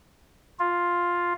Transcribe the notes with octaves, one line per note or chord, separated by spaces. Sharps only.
F4